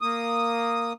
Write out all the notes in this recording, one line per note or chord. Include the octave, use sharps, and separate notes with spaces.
A#3 D#6